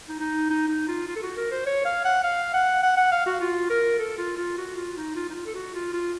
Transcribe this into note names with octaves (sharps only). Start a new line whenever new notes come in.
D#4
D#4
D#4
D#4
F4
F4
A4
F#4
A#4
C5
C#5
F5
F#5
F5
F#5
F#5
F#5
F5
F#4
F4
A#4
A4
F4
F4
F#4
F4
D#4
F4
D#4
F4
A4
F#4
F4
F4